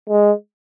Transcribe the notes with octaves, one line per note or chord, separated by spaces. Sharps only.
G#3